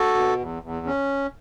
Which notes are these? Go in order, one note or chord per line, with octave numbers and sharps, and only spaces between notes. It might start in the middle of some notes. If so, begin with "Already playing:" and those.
Already playing: F#4 A4
B2
E2
E2
C#4